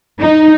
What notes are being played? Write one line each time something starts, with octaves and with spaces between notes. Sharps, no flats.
D#4